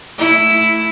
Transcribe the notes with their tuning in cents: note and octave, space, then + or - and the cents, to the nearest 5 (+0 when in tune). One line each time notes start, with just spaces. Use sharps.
A3 +0 E4 +0